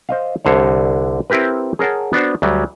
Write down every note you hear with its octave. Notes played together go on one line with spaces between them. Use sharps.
C5 D#5 F5
C2 D3 C5 C#5
C4 E4 G4 A#4 B4
G#4 A#4 C#5 F#5 A5
B3 D4 F#4 C5
D2 F#3 G3